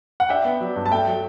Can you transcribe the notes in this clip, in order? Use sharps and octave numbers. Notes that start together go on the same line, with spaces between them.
F#5
D4 E5 G5
B3
F#3
G2
A5
A3 E5 G5
F#3